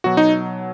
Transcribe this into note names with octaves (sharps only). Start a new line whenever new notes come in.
B2 F#3 F#4
D#4